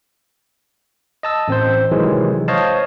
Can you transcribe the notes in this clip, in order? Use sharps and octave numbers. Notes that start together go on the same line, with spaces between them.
D#5 A5 E6
A1 C4 C5
C3 D#3 E3 F#3 G#3
C5 C#5 D#5 F5 A5